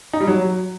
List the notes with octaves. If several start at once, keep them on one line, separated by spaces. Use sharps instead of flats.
D#4
G3
F#3